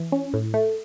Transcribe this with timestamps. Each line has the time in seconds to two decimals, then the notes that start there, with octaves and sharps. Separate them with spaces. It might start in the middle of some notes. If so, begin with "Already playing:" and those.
Already playing: E3
0.12 C#4
0.34 A2
0.54 A3